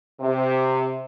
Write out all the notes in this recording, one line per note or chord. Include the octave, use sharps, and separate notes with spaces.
C3